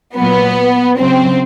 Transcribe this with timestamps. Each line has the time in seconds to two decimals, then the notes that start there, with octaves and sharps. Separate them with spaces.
0.15 A#2 F#3 B3
0.98 C#3 F#3 C4